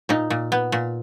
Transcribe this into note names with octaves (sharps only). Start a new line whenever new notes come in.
A#2 D#4
A#2
B3
A#2